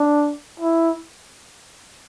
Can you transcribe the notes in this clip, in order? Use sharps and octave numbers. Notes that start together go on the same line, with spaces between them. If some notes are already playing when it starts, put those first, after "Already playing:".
Already playing: D4
E4